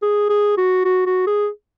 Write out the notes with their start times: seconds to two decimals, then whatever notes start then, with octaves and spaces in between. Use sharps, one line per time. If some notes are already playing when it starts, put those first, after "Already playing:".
0.02 G#4
0.29 G#4
0.57 F#4
0.85 F#4
1.06 F#4
1.27 G#4